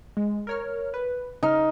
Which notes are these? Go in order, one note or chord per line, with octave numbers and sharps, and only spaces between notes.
G#3
A#4 C#5 F6
B4
C#3 D#4 F6